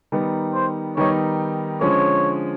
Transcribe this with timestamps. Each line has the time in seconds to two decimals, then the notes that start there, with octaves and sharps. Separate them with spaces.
0.12 D#3 G3 B3 D#4
0.54 C5
0.97 D#3 G3 B3 D#4 C#5
1.81 D3 F3 G#3 C#4 C#5